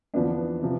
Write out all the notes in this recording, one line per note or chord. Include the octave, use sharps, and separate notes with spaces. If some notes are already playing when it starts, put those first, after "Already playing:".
E2 D3 F3 B3 D4
C3 F3